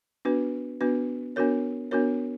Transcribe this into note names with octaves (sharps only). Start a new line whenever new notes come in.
B3 D4 F#4 B4
B3 D4 F#4 B4
B3 D4 F#4 A#4 C#5
B3 D4 F#4 A#4 C#5